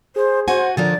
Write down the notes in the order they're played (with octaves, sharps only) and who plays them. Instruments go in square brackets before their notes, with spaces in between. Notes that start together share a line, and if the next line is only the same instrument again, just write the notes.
[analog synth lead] G#4 [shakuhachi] C5
[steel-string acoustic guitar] F#4 G#5 [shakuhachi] C5 [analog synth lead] F#5
[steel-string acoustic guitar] D3 F3 A#4 [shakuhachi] D5 [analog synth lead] A6